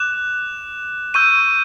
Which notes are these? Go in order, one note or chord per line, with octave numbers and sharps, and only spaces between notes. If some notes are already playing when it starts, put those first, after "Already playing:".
Already playing: D6 F#6 E7
C#6 E6 G6 D#7